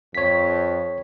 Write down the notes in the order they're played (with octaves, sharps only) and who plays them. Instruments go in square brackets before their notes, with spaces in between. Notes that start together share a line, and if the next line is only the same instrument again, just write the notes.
[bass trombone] F2 [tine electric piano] C#5 B6